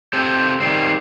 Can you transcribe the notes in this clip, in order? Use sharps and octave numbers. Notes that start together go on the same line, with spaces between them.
C4 G4 A4 G6
D#3 G3 C4 C7